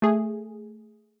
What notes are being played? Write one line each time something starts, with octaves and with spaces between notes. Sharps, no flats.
A3 G#4